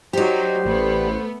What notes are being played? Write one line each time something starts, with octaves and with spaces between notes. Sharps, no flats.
F#3 D#4 G4 C5 D5
A1 A3 B3